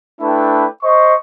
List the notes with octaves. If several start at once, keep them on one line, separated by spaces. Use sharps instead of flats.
A3 D4 E4 B4 G5
C5 D#5 C#6